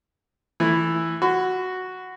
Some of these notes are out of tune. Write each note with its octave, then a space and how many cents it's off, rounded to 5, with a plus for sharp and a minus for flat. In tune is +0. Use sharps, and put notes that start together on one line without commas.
E3 +0 A3 +0 E4 +0
F#4 +0 B5 +45